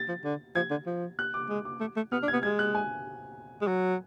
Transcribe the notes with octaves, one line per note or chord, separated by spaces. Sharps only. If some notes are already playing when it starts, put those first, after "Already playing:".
Already playing: A6
F3
D3
F3 G#6
D3
F3
F#6
D6
G#3
D6
A3
A3
B3 F6
D4
G#6
B3
G#3 G#6
F#6
G#5
G#3
F#3